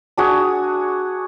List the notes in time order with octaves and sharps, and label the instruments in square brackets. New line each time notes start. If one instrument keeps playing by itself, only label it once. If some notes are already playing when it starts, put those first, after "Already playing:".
[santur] D4 F#4 G#4